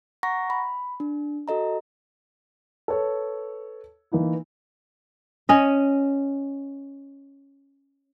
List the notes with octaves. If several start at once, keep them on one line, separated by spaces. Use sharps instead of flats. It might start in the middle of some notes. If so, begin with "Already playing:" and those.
F#5 A#5 C#6 A#6
B5
D4
F#4 A4 D#5 A#5
A4 B4 C#5
E3 A#3 D#4 E4
C#4 D#5